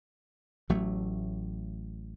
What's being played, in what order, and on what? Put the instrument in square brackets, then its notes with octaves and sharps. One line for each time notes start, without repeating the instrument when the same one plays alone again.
[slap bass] A1 F#3 A3